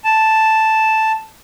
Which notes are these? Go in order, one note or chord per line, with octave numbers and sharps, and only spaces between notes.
A5